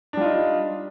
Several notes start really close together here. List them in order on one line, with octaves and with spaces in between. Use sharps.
D4 G3 F4 D#4